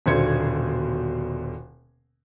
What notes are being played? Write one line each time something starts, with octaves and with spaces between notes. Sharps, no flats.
D#1 B2 D3 C5 G#6 C#7